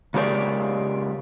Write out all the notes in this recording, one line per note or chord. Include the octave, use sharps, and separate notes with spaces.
C#3 G#3 G4 A#4 D5